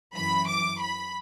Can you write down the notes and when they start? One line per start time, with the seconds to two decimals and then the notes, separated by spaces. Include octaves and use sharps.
0.14 F#2 E3 B5
0.48 D6
0.81 B5